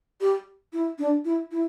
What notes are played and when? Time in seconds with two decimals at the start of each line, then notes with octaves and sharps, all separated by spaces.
0.21 G4
0.73 E4
0.99 D4
1.25 E4
1.51 E4